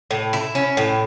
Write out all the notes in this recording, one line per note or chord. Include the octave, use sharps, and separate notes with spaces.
A2
E4
C#4
A2